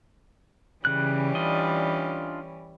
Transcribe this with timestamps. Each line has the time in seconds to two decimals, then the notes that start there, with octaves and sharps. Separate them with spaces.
0.85 C#3 E3 G3 C#4 F#6
1.35 D4 F4 D#5